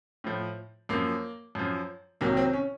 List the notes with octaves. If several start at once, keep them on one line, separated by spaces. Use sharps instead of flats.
A2 F3
F#2 F3 A#3
F#2 F3
C2 C3 D#3 F#3 A#3
C4
C#4